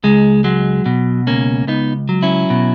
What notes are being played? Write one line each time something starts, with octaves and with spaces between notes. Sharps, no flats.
C#2 G#3
F#3 G#3
B2
C#2 A#3 C#4
C#2 B3 D#4
F#3
C#4 E4
B2